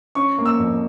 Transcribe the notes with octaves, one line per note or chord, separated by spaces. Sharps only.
C#4 C#6
A#3
E6
F2